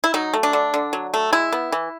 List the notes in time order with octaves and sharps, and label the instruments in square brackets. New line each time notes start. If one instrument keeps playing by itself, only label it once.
[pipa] E4
F#3 D#4
A3
D4
D3
D3
F#3
A3
G#3 E4
B3
E3